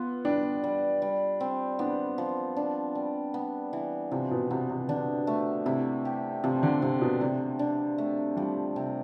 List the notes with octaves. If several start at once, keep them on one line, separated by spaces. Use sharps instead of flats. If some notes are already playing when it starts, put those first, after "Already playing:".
Already playing: B3 F4
G3 D4
G3
G3
C4
B3 D4
F3
D4
G3
B3
E3
C3 F3
B2
C3 B3
C3
D3 D4
A3
C3 E4
G4
C3 F3
D3
C3 F3
B2
C3 D4
D4
A3
F3 G3
C3